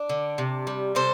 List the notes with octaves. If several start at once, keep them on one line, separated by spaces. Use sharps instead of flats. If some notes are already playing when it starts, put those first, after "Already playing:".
Already playing: D4
D3
C3
G3
C3 A4 C5